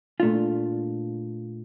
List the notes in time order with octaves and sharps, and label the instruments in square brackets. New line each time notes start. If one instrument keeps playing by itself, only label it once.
[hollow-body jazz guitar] A#2 A3 D4 F4